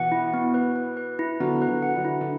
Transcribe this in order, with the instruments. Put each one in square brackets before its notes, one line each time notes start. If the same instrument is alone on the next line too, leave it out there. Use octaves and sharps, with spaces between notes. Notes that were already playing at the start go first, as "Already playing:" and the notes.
Already playing: [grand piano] B2 E3 [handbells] F#5
[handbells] E4
B3
B4
B4
B4
E4
[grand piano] D3 F#3 [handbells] B3
[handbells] B4
[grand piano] D3 F#3
[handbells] F#5
[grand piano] D3 F#3
[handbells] E4
[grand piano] D3